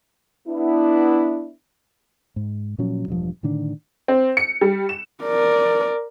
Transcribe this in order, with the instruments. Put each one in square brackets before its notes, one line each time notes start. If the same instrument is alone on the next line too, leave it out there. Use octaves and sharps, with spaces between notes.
[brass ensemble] B3 D4 E4
[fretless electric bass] G#2
A#2 F3 F#3 C#4
E1 G2 F3
A2 D3 D#3 D4
[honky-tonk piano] C4
C#7
G3
E7
[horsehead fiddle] A#4 D5